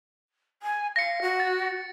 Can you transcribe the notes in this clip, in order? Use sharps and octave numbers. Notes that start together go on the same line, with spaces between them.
G#5
F5 A#6 C#7
F#4
A6